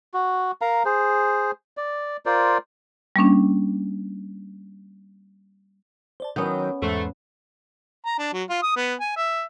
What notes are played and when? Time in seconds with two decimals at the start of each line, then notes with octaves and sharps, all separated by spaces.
0.14 F#4
0.61 A#4 F5 A#5
0.85 G#4 C5
1.77 D5
2.26 F4 A#4 C5 D5
3.16 G3 A#3 C#4 D4
6.20 C5 D5 A5
6.36 D#3 F#3 B3 C#4 G5 D#6 G6
6.82 E2 G#2 A3 B4 C5
8.06 A#5
8.19 D4
8.33 F#3
8.50 F4
8.63 D#6
8.76 B3
9.00 G#5
9.17 E5